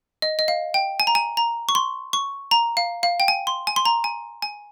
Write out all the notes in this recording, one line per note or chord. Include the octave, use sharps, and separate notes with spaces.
D#5
D#5
F5
G5
G#5
A#5
G#5
A#5
C#6
C6
C#6
A#5
F5
F5
G5
G#5
C6
G#5
C6
A#5
G#5
G#5